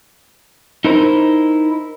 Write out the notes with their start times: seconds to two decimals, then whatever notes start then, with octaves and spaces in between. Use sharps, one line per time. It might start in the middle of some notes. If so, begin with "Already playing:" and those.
0.85 D#4 E4 A#4 C5